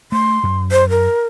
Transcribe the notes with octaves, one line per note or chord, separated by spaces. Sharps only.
A3 C6
F#2
C5
A#4